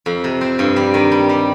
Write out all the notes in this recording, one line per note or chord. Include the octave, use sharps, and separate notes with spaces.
F2
C3
C4
G2
G3
D#3
G3
G3